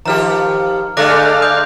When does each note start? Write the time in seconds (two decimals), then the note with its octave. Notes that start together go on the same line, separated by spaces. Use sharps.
0.06 D#3 F3 G4 A#5 F6
0.97 D3 G#3 A3 D5 F5 D6 F#6 A#6
1.42 D#6 G6